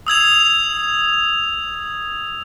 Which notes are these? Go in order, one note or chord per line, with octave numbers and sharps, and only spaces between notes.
D#6 E6 G#6 F7